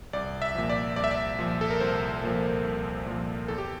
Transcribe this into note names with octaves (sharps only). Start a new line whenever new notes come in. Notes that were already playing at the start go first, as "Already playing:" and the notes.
C2 D5
E5
A#2 F3
D5
C2 D5
E5
D5
A#2 F3
A4
A#4
C2 C5
A#2 F3
C2
A#2 F3
E2 A4
G4